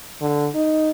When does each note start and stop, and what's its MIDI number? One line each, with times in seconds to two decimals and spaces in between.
0.21 0.47 50
0.55 0.90 63